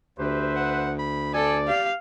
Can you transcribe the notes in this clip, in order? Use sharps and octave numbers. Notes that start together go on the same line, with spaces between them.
D2 G4 B4 C5 E5
F#5
B5
A4 D5 G#5
G4 F5